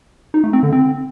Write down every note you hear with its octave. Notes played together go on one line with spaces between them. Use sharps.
D#4
A3
C4
D3
C4